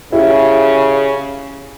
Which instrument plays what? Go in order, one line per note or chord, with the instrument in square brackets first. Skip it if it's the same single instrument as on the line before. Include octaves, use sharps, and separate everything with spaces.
[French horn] C#3 [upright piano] E4 G4